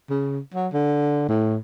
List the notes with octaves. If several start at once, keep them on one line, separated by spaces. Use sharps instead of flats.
C#3
F#3
D3
A2